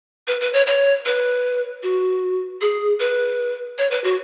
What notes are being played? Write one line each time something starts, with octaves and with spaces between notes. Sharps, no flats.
B4
B4
C#5
C#5
B4
F#4
G#4
B4
C#5
B4
F#4